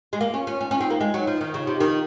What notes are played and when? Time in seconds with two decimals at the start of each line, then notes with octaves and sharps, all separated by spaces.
0.13 G#3
0.20 A#3 F4
0.34 C#4
0.47 C#4
0.60 C#4 D#4
0.71 C#4
0.81 C4
0.90 A#3
1.00 G#3
1.14 F#3
1.27 F3
1.41 D#3 F4
1.54 C#3
1.67 C3
1.80 D#3